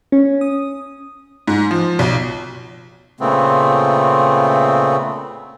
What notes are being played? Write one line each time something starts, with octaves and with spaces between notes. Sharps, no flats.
C#4
D#6
G#2
F3
B1
A#2 C#3 A3 B3 C4